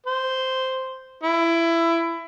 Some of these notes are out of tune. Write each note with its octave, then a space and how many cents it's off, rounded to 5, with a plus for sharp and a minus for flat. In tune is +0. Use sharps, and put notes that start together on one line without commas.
C5 -5
E4 +20